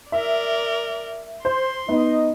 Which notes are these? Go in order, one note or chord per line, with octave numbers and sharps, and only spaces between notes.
A#4 D5 E5
C5 C6
B3 D#4 D#5